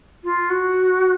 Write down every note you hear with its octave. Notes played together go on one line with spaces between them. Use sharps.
F4
F#4